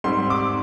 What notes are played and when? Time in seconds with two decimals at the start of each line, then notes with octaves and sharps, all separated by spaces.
0.04 G#2 G3 C4 C6
0.30 D6